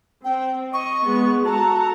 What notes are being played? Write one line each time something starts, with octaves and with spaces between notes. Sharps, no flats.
C4 G5
D#5 C#6
G#3 B3
F#4 A4 A5 A#5